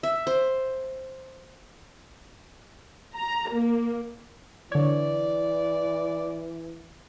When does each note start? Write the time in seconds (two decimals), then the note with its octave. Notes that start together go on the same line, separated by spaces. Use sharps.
0.03 E5
0.27 C5
3.16 A#5
3.51 A#3
4.72 D3 E3 C#5 D5